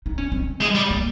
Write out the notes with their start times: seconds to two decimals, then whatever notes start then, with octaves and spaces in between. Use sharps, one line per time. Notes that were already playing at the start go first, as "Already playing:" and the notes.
0.06 D#4
0.18 C#4
0.32 C4
0.61 G#3
0.75 G3
0.90 A#3